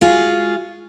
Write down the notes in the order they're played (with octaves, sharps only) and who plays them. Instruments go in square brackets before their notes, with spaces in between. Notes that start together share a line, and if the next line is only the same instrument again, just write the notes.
[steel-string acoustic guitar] G#3 F4 F#4 G#4